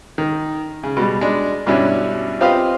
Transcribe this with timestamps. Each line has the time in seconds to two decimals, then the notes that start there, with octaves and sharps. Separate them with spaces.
0.18 D#3
0.83 C#3
0.97 B2 G3
1.21 G#3 D4
1.67 G2 B2 C#4 D4 E4
2.41 C4 F4 G4 B4 D#5 F5